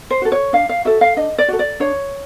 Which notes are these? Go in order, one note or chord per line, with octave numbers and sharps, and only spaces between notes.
C5
F#4 A4
C#5
D4 F5
F5
F#4 A4 E5
F5
D4 D#5
D5
F#4 A4
D5
D4 C#5